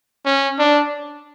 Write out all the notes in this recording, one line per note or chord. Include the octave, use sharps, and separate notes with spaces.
C#4
D4